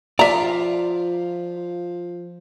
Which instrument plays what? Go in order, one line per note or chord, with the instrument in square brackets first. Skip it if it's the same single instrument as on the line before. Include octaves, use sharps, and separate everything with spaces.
[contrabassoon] F3 [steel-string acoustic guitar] F4 [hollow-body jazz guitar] D5 [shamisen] E5 A#5